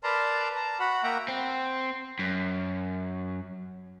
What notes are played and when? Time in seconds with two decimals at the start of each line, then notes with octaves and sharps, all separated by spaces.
0.04 A#4 B4 D5 A5 A#5 C6
0.56 A5 A#5
0.80 F#4 F#5 B5
1.03 A#3 E5 F#5 G5 A#5
1.28 C4
2.19 F#2